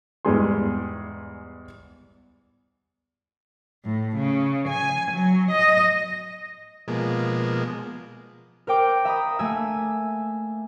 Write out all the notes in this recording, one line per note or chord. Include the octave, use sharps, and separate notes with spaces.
E2 G#2 E3 G3 G#4 C6
A2
C#3
G#5
F#3
D#5
B2 F3 G#3 A#3
A#4 C5 G5 D6
E5 A#5 B5 D#6
A3 A#3 E5 G#5 E6